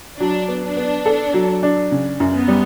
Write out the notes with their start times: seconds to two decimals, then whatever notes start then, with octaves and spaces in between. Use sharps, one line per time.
0.20 F#3 D4
0.48 B3
0.63 D4
0.77 B3
1.06 A4
1.34 F#3
1.63 D4
1.91 C#3
2.20 F#2
2.34 B3
2.48 G3